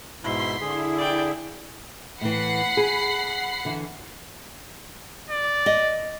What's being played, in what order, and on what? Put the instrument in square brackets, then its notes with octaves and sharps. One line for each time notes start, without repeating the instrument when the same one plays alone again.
[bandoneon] G#2 B2 E4 [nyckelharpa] C6 [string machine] B6 C7
[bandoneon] D3 G#4 [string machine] E4
[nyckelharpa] D5 G5
[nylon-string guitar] A2 E3 [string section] F#5 B5 C7
[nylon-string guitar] G#4
D3 E3
[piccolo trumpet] D5
[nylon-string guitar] D#5